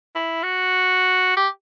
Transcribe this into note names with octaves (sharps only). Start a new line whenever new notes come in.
E4
F#4
G4